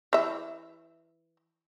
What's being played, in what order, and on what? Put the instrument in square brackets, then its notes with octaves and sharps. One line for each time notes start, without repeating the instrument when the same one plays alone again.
[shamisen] E3 E5